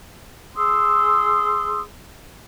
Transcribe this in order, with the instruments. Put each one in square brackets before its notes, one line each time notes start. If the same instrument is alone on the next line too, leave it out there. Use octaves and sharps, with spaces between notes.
[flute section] G#4 C6 D#6 E6